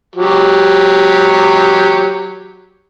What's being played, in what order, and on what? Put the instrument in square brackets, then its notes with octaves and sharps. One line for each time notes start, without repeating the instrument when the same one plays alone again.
[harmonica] F#3 G4